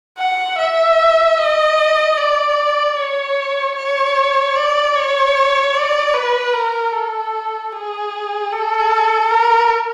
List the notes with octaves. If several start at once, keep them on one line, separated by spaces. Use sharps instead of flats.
F#5
E5
D#5
D5
C#5
C#5
D5
C#5
D5
B4
A#4
A4
G#4
A4
A#4